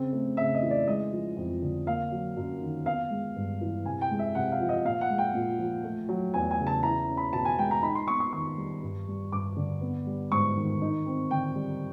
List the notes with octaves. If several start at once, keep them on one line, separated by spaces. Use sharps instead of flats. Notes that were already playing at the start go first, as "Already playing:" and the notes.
Already playing: C#3 C4
A3
C#3 E5
D#5
E3
D5
G#3 D#5
F3
F2
D3
A#3 F5
F#3
F#2
D#3
B3 F5
G#3
G2
E3
C3 G#5
G5
G#3
E5
C3 F#5
F5
F3
D#5
A#2 F5
F#5
G#3
G5
A#2
F3
A3
F#3
E2 G#5
G#5
C#3
A5
E4 A#5
C#4
B5
B2 A5
G#5
G#3 G5
A#5
D#4 B5
C6
B3 C#6
C#6
D#3 C#6
G3
G2
G3
G2 D6
D3
B3
G3
G#2 C#6
D#3
D#4
C4
D3 G5
G3